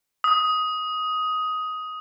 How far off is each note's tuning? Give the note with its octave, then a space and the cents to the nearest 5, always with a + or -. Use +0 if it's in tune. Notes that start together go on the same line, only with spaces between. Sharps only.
D#6 +10